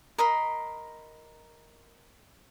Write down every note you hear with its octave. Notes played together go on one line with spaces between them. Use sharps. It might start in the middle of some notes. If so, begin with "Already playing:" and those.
A#4 D#5 B5 C6